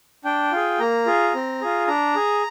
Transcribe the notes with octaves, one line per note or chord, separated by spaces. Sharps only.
D4 G5
F4 G#4
A#3 A#5
F4 G#4
C4
F4 G#4
D4 A#5
G#4